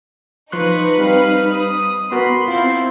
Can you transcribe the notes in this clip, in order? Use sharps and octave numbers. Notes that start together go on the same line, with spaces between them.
F3 D#4 B4 C6 C#6 F#6
G3 C4 F5
D#6
B3 F#4 A#4 B5 C6
C4 E4 F4